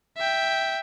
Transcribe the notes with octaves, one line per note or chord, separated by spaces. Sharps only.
E5 G5